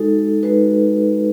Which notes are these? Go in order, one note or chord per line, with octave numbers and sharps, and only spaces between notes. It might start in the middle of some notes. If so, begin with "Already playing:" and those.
Already playing: G#3 D#4 F#4 A4
G#3 D#4 F#4 B4